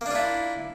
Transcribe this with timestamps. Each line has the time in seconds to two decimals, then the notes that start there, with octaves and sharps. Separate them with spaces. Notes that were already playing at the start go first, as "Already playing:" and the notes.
0.01 A#3
0.06 D4
0.11 F4
0.15 E4